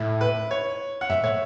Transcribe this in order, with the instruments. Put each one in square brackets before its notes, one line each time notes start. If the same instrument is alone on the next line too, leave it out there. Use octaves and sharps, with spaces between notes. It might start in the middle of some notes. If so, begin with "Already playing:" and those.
Already playing: [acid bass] A2 [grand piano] E4
[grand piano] B4
C#5
F#5
[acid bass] F#2 [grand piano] E5
[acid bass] A2 [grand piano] C#5